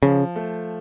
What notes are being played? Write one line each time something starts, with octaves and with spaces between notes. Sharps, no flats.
C#3 F3
A3